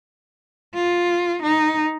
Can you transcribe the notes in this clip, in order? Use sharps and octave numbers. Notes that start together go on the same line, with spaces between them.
F4
D#4